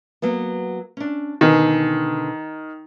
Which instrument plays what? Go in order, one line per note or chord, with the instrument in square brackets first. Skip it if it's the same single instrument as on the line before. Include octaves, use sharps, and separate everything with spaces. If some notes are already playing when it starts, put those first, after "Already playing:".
[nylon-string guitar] F#3 A#3 B3
C#4 D4
[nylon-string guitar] B2 D3 G#5 [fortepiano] D#3